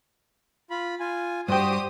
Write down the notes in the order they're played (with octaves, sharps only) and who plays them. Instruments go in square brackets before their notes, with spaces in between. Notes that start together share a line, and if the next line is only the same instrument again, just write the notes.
[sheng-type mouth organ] F4 B5
F4 G#5
[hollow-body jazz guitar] G2 G5 [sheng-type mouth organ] F#4 [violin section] G4 C5 D#6